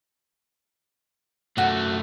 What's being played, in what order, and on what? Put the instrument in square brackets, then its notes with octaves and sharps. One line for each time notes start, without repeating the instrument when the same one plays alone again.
[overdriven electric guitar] F#2 A3 [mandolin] F#4